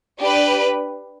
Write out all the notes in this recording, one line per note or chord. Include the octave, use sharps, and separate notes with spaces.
D4 G4 B4